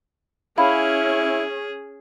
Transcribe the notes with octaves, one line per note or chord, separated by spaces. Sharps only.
C#4 E4 G#4 F5 B5